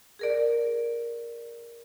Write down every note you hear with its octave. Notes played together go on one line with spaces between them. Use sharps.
G#4 A#4 D5